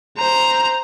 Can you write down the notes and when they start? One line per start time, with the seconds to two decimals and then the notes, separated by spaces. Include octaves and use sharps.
0.17 C5 A#5